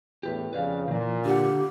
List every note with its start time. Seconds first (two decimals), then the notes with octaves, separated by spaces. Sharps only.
0.23 E2 A2 G4 B4
0.53 F2 C#3 B4 D5 F5
0.88 A#2 D#3 E3
1.25 D3 G4 F#5